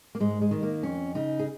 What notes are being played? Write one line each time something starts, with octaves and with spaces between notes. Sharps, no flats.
A#3
G#2 G#3
G#3
D#3
A#3
F2 C#4
C#3 D#4
G#4